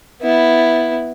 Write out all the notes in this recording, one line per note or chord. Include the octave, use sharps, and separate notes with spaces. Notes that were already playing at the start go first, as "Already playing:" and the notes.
B3 E4